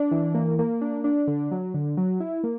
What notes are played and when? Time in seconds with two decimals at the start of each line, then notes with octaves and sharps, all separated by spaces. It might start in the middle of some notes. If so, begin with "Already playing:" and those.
Already playing: D4
0.11 E3
0.34 A#3
0.59 A#3
0.81 D4
1.04 D4
1.27 D3
1.51 F#3
1.74 D3
1.97 F#3
2.20 E4
2.44 A#3